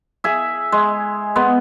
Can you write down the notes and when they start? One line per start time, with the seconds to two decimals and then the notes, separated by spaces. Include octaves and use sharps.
0.24 G#4 E5
0.72 G#3
1.36 G#3 B3